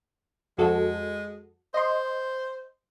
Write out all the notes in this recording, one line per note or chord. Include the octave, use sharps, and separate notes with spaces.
F2 G#3 F#4 A4
C5 D#5 C6